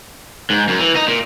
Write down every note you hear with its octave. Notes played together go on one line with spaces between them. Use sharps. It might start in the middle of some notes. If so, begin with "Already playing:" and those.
G#2
F#2
E3
D#4
A#2